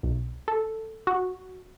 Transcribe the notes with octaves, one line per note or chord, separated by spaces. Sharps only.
B1
A4
F#4